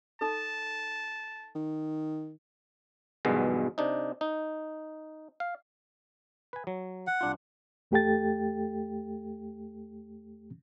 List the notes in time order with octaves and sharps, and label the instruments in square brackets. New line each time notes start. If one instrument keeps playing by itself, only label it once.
[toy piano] D#4 A4 [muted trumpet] A5
[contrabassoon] D#3
[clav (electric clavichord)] B1 E2 G2 B2 D#3 G#3
C3 D4 D#4
D#4
F5
B4 G#5
F#3
[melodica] F#5
[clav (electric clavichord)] C2 D4 F4
[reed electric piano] E2 A3 G4 A4 G5 A6